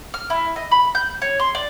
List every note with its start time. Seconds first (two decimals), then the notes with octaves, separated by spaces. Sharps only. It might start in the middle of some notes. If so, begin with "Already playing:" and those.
0.14 F6
0.30 E4
0.56 D#5
0.71 B5
0.95 G6
1.22 C#5
1.40 C6
1.55 D5